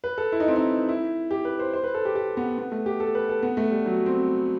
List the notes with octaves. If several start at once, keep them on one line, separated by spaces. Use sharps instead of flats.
B4
A4
E4
D#4
C4
D#4
E4
G4
B4
C5
C5
B4
A4
G4
G4
B3
B3
A3
G4
A4
B4
A4
B3
A3
G3
F#3
C4